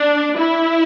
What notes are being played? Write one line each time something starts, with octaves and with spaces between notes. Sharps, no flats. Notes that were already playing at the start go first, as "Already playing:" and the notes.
Already playing: D4
E4